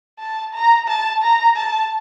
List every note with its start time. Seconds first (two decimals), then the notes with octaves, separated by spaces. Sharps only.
0.19 A5
0.53 A#5
0.88 A5
1.22 A#5
1.56 A5